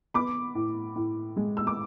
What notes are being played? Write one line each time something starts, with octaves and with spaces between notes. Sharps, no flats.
B3 B5 D6
A2
A2
G#3
E6
D6